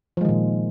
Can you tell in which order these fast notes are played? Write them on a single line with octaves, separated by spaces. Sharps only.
F3 G#3 D#3 A#2